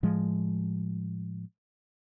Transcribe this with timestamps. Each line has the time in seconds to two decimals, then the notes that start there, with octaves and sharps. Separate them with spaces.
0.03 A2 F3 G#3